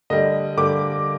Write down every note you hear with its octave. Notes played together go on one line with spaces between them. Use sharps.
D3 G3 D#5
D3 G3 D6